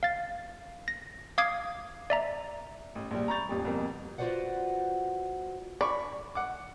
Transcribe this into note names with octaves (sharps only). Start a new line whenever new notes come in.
F5 A6
A#6
F5 D6 D#6 G#6 C7
D5 E5 A#5
A1
A#1 G3
A#5 B5 C#6 G6 A6 F7
D#1 A1 G4
C2 F2 B2 A#3
F4 F#4 B4 C5 D5 F#5
D5 B5 C#6
F#5 D6